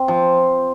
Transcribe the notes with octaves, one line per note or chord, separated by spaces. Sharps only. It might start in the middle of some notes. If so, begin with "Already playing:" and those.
Already playing: C4
F3